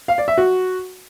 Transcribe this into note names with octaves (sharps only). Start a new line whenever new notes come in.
F5
D5
E5
F#4